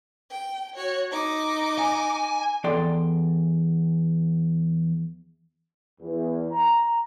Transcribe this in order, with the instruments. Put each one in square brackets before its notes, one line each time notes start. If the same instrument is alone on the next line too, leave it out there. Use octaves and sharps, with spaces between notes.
[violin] G5
F#4 C#5
D#4 D6
[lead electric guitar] G#5
[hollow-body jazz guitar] E2 A4 D5 G5 C6
[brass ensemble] E2
A#5